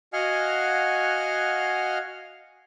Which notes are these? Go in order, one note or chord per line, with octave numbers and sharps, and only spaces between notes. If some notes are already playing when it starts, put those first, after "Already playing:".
F#4 D#5 F5 F#5 G#5 F6